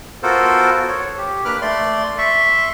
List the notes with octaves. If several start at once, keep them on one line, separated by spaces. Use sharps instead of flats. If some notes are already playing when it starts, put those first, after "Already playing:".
B3 F4 F#4 A4 A#4 C5
C#5
G4
A#3 D4 B4 D6 F6 F#6
A3 D5 C6
E5 C6 C#6